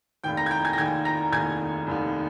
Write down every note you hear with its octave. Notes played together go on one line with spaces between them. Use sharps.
F1 D#2 D#3 G5 G6
A#5 A#6
G#6
G5 G6
G#5 G#6
A#6
F1 D#2 D#3 G#5 G#6
A#5 A#6
F1 D#2 D#3 G#5 G#6
F1 D#2 D#3